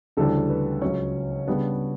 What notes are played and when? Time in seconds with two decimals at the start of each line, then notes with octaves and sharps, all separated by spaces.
0.17 D2 C#3 E3 G3 D4 A4
0.49 B4
0.81 C#2 C#3 F#3 C#4 C#5
1.47 C#3 G3 B3 D4